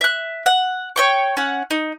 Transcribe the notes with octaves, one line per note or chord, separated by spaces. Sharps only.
E5 F#6
F#5
C#5 G5 C#6
C#4 F#5
D#4